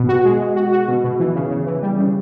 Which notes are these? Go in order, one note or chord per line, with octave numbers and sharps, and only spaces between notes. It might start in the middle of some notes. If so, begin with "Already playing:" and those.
Already playing: B2
F#4
G#3
G#3
F#4
F#4
B2
B2
E3
C#3
C#3
E3
G3
C#3